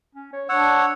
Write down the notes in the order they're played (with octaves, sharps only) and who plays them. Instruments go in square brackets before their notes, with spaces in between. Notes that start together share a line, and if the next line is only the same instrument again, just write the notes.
[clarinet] C#4
C#5
[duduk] D4 [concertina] C#5 F#5 [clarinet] E6